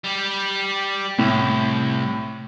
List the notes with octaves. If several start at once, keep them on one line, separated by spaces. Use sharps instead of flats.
G3 G4
C2 A2